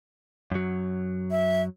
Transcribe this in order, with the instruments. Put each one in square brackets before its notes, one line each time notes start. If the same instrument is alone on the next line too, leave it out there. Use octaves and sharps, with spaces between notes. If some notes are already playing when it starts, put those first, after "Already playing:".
[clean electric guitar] F#2 F#3
[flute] E5